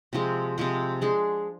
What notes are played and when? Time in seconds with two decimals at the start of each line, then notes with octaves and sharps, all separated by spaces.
0.13 C3 F3 G#3
0.58 C3 F3 G#3
1.01 G#3 D4 G#4